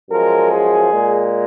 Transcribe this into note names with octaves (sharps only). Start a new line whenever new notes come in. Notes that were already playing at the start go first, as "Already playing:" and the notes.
F#2 F3 G#3 A#4
G#4
A#2 G#3